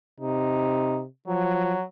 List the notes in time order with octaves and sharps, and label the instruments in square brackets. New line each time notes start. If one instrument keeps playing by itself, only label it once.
[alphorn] C3 [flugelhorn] D#4
[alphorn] F3 [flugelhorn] F#3